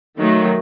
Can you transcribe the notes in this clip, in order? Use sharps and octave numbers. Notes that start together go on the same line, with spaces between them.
D#3 F#3 A3